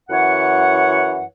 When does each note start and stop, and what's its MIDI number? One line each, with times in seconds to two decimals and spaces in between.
0.10 1.23 42
0.10 1.23 52
0.10 1.23 73
0.10 1.23 78